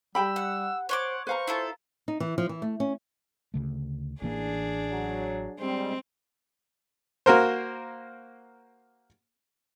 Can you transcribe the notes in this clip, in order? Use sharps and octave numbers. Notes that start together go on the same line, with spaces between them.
G3 G4 G5 B5 E6
F#5
C5 C#5 F#5 C6 D6
B4 C5 F5 A#5 C#6
E4 F4 A4
D#4
E3
F3
E3
A3
C#4
D2 C#3 A3
A1 E3 A#3 D4 G#4
F#3
G3 G#3 C4
A#3 F#4 A#4 C5